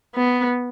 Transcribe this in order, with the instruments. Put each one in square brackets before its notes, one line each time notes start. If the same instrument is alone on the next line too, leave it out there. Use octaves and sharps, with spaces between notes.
[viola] B3